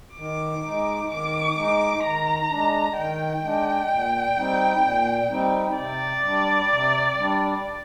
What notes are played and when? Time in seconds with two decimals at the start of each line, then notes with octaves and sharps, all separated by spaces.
0.17 D#3 D6
0.63 G#3 D#4
1.11 D#3 D6
1.56 G#3 D#4
2.03 D#3 A#5
2.50 G#3 D4
2.96 D#3 G5
3.44 G#3 D4
3.89 A#2
4.36 G3 C4 D#4
4.83 A#2
5.29 G3 C4 D#4
5.76 C3 D5
6.24 G3 D4
6.70 C3
7.17 G3 D4